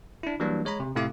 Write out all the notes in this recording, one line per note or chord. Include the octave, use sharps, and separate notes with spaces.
D4 E4
E3 F#3 G3 A#3 D4
G#3 C#5 A#5 B5
C3
A2 C3 A3 E4 F5 D6